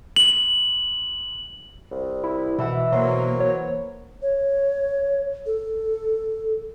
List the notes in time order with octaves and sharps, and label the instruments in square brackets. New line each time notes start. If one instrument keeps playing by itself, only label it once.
[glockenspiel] F#7
[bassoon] C2
[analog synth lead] E4
[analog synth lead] B2 [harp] E3 E5 F#5
[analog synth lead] B2 [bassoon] F#3 [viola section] A#3 [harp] C5
[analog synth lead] C#5
[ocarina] C#5
A4